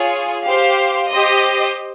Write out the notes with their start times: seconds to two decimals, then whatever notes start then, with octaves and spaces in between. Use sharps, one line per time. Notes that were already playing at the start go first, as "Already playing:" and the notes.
Already playing: F4 G#4 C#5
0.43 G4 C5 F5
1.10 G4 C5 D#5